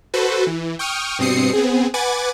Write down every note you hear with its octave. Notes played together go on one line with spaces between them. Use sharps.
F#4 A4 B4 C5
E3
G5 C#6 D#6 F6
G2 B2 C4 D#6 C7 C#7
B3 C4 G#4
B4 F#5 G#5 D6 G#6 A6